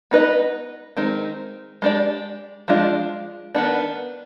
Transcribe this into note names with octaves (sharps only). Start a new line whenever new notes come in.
B3 D#4 B4 D#5
D#3 G#3 C4 D#4
G#3 D4 G4 D5
F3 G#3 D4 F4
D#3 B3 D4